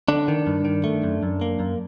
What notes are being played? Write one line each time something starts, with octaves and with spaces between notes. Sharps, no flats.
D3 D4
D#3
G2
D#3
A3
F#2
F#2
A#3
F#2